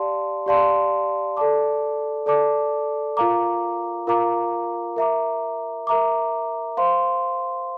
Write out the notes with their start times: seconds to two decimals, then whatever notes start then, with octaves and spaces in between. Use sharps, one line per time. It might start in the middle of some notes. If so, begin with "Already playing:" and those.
Already playing: G4 D5 F5 A5 C6
0.46 G4 D5 F5 A5 C6
1.37 A4 D5 A5 D6
2.26 A4 D5 A5 D6
3.17 F4 A#4 F5 A#5 D6
4.07 F4 A#4 F5 A#5 D6
4.96 A#4 E5 A#5 D6
5.87 A#4 E5 A#5 D6
6.77 C5 F5 C6